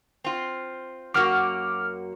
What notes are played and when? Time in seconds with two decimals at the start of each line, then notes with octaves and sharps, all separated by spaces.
0.24 C4 F4
1.14 F#2 A#3 F#4 D6 F6